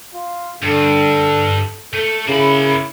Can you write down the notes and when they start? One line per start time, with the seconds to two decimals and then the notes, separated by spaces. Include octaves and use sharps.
0.14 F4
0.63 G2 D3 A4
1.93 A3 A4
2.27 C#3 A#3 E4 B5